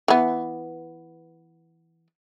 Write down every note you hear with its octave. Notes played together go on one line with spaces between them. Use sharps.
E3 B3